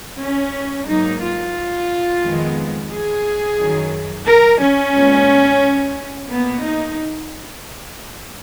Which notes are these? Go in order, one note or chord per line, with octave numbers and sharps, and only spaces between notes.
C#4
G#2 F#3 A#3 D#4
F4
F2 D#3 G#3 B3
G#4
F#2 D#3 F#3
A#4
C#4
A#2 G#3 B3
B2 A#3 B3
D#4